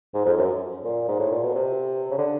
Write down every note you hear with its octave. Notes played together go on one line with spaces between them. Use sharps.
G#2
F2
F#2
A#2
G#2
A2
A#2
B2
C3
C#3
D3